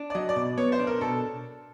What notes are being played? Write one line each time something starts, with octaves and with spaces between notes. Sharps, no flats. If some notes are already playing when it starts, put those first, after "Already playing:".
Already playing: D4
D5
F#3 D#5
D5
B2
B3 C#5
C5
D4
A#4
B2 A4